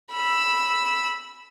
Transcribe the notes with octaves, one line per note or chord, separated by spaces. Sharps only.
B5 E6